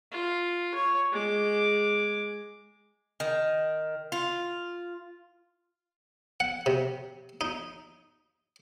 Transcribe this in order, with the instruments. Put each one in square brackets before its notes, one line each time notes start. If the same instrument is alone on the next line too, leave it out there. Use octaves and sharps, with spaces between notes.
[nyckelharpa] F4
C#5
G#3 D6
[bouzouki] D#3
F4
[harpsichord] F#5
C3
D#4